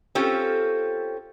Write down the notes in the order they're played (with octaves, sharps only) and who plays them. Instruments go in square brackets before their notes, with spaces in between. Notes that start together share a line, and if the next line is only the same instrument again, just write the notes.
[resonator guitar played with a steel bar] C4 C#4 F4 G4 A4